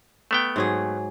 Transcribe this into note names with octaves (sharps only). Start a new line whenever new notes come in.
A3 B3 G5
G#2 F#3 G#4